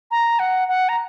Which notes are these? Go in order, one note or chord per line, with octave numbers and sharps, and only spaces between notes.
A#5
F#5
F#5
A#5